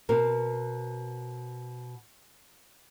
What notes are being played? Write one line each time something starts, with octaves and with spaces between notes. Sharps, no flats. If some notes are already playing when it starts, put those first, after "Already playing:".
B2 C4 A#4